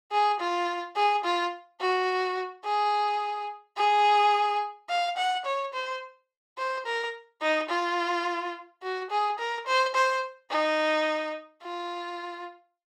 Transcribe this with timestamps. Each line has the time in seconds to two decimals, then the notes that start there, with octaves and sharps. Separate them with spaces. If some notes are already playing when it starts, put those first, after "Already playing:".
0.12 G#4
0.40 F4
0.96 G#4
1.24 F4
1.80 F#4
2.64 G#4
3.77 G#4
4.89 F5
5.17 F#5
5.45 C#5
5.73 C5
6.58 C5
6.86 A#4
7.41 D#4
7.69 F4
8.83 F#4
9.10 G#4
9.38 A#4
9.67 C5
9.95 C5
10.50 D#4
11.63 F4